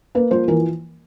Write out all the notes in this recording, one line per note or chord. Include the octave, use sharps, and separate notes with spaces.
A#3 B4
F3 C5
E3 A#4